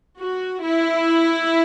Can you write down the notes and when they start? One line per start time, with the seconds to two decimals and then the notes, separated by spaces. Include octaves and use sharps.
0.20 F#4
0.63 E4